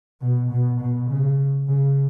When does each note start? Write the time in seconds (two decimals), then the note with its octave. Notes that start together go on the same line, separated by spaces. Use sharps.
0.21 B2
0.51 B2
0.81 B2
1.10 C#3
1.68 C#3